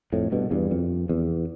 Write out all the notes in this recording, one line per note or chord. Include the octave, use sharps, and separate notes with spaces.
F2 A2
G2 B2
E2 G2
F2
E2